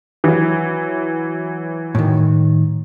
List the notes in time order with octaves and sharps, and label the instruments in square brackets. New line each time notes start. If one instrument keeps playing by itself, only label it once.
[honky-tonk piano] E3 F#3
[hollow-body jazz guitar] A2 D#3